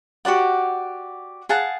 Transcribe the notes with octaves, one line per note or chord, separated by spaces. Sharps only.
F#4 G4 D5 F#5
G#4 F5 F#5 A5